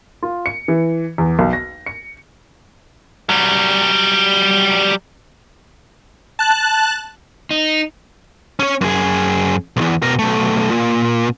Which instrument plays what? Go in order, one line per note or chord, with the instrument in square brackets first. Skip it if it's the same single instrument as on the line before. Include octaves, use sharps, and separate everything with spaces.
[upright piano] F4
C#7
E3
E2
B1
A#6
C#7
[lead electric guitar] F#3 G3
[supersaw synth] A5 F#6
[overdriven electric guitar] D#4
[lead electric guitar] C#4 C#5
F#2 G#4
B1 E2
B2 A#4
B1 A3
A#2